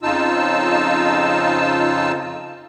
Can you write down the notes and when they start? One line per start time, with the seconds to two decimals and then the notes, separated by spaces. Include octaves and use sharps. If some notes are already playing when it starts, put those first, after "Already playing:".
0.03 F2 C#3 D#4 F4 A5 E6